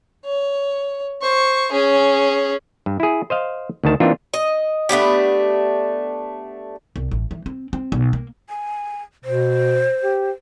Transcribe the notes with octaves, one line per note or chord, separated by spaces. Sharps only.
C#5
C5 C#6
C#4 G#4
G2
E4 G#4
C5 D#5 F5
D2 D#3 A5
E3 A#3 C4 D4 D#4 F4
D#5
A3 B3 D4 G4
C2
A1
E3
C4
C4
B1
A#3
G#5
B2 C5
G4